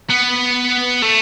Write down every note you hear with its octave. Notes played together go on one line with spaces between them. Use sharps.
B3
A3